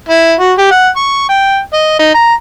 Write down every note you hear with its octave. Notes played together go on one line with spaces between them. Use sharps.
E4
F#4
G4
F#5
C#6
G5
D#5
D#4
A#5